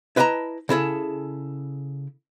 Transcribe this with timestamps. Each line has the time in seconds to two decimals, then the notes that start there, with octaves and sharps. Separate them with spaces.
0.16 E4 B4 D#5 G5 A5 A#5
0.69 C#3 E4 G#4 A4